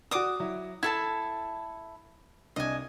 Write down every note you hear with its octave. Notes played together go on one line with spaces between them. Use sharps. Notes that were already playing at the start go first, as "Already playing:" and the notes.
F#4 D5 D6 D#6
F#3 E4
E4 A4 A5 G#6
C2 D4 D#5 G#5